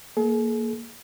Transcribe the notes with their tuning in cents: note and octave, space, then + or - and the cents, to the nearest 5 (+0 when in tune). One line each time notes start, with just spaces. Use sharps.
A#3 -5 G#4 +40